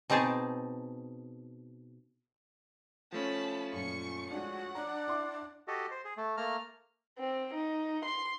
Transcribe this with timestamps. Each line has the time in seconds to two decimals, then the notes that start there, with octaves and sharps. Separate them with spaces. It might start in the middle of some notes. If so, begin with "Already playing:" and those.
0.10 B2 C4 D#4 G#4 A5
3.12 F3 A3 C#4 A5 B5
3.72 F#2 A#2 C#6 C#7
4.31 G#3 D4 F#4 F#5
4.75 D4 A#5
5.08 E4 C6 D6
5.68 F#4 G4 A4 D#5
5.91 C5
6.05 G#4
6.17 A3
6.37 A3 A#3 A#5 F6
7.19 C4
7.55 D#4
8.05 C6